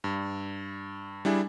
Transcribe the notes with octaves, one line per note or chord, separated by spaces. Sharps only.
G2
G3 D4 E4 G#4